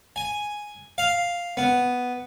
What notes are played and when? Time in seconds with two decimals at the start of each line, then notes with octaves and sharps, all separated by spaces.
0.16 G#5
0.98 F5
1.57 B3